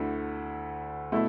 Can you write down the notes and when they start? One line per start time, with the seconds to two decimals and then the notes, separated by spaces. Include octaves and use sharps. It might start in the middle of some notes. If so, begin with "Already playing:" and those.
Already playing: D2 D3 A3 E4
1.12 B2 A3 E4